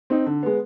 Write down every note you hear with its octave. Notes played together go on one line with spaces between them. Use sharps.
C4 D#4
D3
G#3 B3